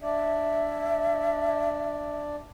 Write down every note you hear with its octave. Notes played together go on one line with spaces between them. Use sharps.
D4 D5 E5